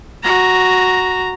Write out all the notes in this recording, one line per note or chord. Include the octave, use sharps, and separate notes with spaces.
F#4 A#5